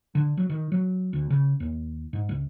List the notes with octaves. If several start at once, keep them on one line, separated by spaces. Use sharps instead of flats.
D3
F#3
D#3
F#3
D2
C#3
D#2
G#2
C#2